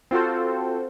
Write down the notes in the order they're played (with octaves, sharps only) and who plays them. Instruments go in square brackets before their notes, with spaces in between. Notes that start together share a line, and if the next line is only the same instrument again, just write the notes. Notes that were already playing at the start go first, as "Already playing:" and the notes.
[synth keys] C4 F4 F#4 A4 C5